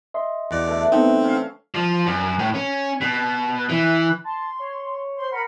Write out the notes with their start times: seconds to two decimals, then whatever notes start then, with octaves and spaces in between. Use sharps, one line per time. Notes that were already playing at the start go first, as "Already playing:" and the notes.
0.14 D#5 E5 C6
0.51 E2 F#4 D5
0.66 D3 E3 A3
0.92 B3 C4 D#4 A4
1.24 C#4 F5
1.74 F3
2.06 F#2
2.39 A2
2.55 C#4
3.01 B2
3.69 E3
4.24 A5 C6
4.59 C#5
5.17 C5 C6
5.30 A#4 F#5 B5